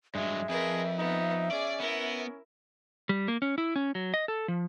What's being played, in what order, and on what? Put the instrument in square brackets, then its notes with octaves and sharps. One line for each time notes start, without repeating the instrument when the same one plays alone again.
[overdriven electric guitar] G2 F#3 [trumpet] G#3 [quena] E5
[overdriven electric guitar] F2 [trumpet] G#4 [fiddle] A#4 B4
[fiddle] B3 [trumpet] D#4
[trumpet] C#4 [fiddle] G#4 [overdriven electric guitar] D5
[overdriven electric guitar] B3 [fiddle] E4 A#4
[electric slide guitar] G3
A#3
C#4
E4
C#4
F#3
D#5
A4
F3